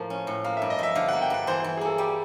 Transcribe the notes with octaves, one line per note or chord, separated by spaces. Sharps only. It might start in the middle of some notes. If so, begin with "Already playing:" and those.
Already playing: A2 F3 A#3
C#4
A2
A#3 F5
G2 E5
D#5
F3 E5
D3 F5
A#3 F#5
G5
G2 F#5
E3 C5
E3 C5
G#4
A#3 A4
G3 G4